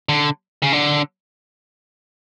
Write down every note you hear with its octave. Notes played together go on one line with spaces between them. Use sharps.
D3
C#3
D3